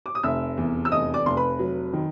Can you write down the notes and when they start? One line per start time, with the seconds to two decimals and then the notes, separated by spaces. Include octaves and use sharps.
0.06 D6
0.15 D#6
0.23 F1 E5 E6
0.57 E2
0.85 E6
0.92 F1 D#5 D#6
1.14 D5 D6
1.26 F1 C6
1.37 B4 B5
1.59 F#3
1.93 D#3